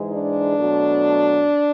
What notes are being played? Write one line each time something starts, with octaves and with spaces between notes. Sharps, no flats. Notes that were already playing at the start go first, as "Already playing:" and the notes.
Already playing: G#2 E3 G#3
D4
B2 F#3 A3